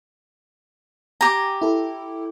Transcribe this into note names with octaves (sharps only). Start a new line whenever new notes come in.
G4 G#5 A#5
E4 A4